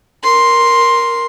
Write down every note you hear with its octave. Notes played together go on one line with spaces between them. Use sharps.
A#4 C6